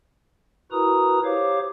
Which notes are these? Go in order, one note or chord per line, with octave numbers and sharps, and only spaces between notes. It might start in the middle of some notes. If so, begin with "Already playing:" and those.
E4 F#4 A#4 B4 A#5 D#6
G4 C5 C#5 F5 D6